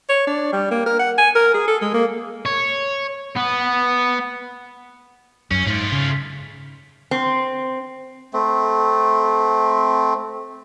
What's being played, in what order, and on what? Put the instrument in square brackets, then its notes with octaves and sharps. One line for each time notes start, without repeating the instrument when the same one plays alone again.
[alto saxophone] C#5
D4
G3
A#3
A#4
F#5
G#5
A#4
G#4
A4
G#3
A#3
[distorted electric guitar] C#5
B3
[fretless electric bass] F#2 [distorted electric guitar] C#4
[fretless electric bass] G#2 [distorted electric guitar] A3 F4
[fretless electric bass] C#3
[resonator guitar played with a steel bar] C4
[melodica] A3 C4